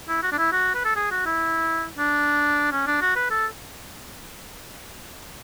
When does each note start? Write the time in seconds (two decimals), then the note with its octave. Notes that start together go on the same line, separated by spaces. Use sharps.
0.09 E4
0.23 F#4
0.32 D4
0.38 E4
0.52 F#4
0.75 B4
0.85 A4
0.96 G#4
1.11 F#4
1.26 E4
1.99 D4
2.72 C#4
2.87 D4
3.01 F#4
3.16 B4
3.31 A4